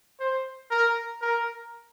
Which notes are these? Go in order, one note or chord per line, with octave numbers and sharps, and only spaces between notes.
C5
A#4
A#4